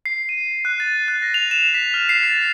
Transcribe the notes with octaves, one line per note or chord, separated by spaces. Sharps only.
C7
D#7
F#6
A6
F#6
A#6
F7
E7
B6
F6
C7
A6